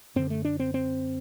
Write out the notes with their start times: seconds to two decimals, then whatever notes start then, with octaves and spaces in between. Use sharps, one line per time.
0.16 F#2 D3 C4
0.30 A3
0.45 D4
0.59 C4
0.74 C4